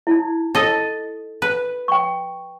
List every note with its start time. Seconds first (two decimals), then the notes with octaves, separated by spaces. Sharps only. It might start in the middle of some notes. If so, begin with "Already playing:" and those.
0.07 D#4 E4
0.55 A4 D#5
1.42 B4
1.88 G5 C#6